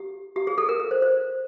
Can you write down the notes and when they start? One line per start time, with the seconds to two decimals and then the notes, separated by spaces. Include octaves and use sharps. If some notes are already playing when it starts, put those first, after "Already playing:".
Already playing: G4
0.36 G4
0.47 G#4
0.58 A4
0.69 A#4
0.80 A#4
0.91 C5
1.02 C5